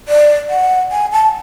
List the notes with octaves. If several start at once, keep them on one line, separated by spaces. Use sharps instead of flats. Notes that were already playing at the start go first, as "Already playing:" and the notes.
D5
F#5
G#5
A5